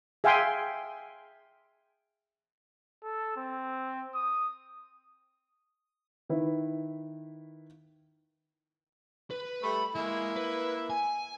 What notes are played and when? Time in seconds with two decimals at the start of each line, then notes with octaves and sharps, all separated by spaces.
0.24 G#4 E5 F5 G5 G#5 C6
3.04 A4
3.37 C4
4.14 D#6
6.29 D#3 E4 B4
9.31 B4
9.64 G3 A3 B5
9.96 G#3 A#3 E4
10.36 B4
10.90 G#5